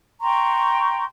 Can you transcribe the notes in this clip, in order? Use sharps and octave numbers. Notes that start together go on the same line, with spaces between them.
G5 A#5 C6 C#6